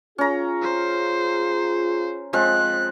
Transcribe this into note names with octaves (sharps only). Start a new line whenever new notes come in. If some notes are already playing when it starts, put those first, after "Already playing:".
C#4 F4 G#4 A#5
C5
F3 G#3 C4 F#6